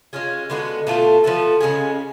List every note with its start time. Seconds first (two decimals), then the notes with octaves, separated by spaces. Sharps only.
0.13 G#3 C#4 F4 G#4
0.50 D3 G#3 B3 F#4
0.87 B2 A3 F4 A4
1.24 F3 B3 F#4 A4
1.61 C#3 G#3 C#4 G#4